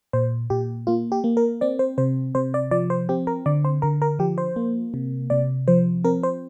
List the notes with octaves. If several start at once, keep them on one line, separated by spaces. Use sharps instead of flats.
A#2 C5
A#2 G4
A#3 F4
G4
A#3
A#4
C4 D5
C5
C3 C5
C3 C5
D5
F3 D5
C5
C4 G4
A#4
D3 D5
C5
D3 A#4
A#4
F3 G4
C5
A#3
C3
C3 D5
F3 C5
C4 A#4
C5